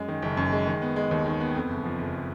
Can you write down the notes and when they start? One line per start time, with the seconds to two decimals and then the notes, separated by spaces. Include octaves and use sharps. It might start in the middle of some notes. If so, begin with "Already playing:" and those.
Already playing: F#2 G#3
0.08 D#3
0.22 F#1
0.37 F#2
0.52 G#3
0.67 D#3
0.82 B3
0.96 G#3
1.11 D#2
1.26 D#3
1.40 B3
1.55 F2
1.69 F#1
1.85 F3
1.99 F#1